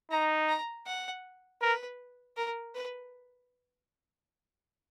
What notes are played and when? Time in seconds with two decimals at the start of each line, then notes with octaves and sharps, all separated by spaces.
0.11 D#4 A#5
0.49 A#5
0.87 F#5
1.62 A#4 B4
2.37 A#4
2.74 B4